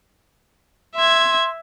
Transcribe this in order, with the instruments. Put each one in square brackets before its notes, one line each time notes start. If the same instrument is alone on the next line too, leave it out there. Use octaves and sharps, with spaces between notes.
[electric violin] E5 G#6 [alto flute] C6